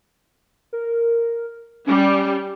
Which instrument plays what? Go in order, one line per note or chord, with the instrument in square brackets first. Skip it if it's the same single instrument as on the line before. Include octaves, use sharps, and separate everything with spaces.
[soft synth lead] A#4
[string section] G3 [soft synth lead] C#4